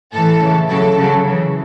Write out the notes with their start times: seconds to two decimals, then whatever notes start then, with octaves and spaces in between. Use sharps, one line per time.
0.12 A2 E3 A4
0.40 C#3 E3
0.69 C#3 F#3 A4
0.97 C#3 F#3
1.25 C#3 E3